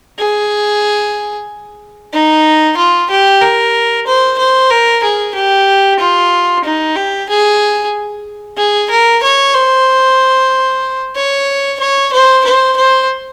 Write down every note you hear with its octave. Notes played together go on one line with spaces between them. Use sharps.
G#4
D#4
F4
G4
A#4
C5
C5
A#4
G#4
G4
F4
D#4
G4
G#4
G#4
A#4
C#5
C5
C#5
C#5
C5
C5
C5